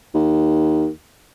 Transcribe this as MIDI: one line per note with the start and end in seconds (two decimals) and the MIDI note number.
0.14 0.88 39